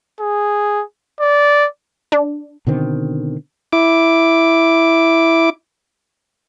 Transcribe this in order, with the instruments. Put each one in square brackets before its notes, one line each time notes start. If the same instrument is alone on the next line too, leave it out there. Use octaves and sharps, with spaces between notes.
[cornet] G#4
D5
[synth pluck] D4
[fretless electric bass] B2 D3 D#3 C4
[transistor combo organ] E4 D6